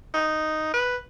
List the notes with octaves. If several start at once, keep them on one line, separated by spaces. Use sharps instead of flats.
D#4
B4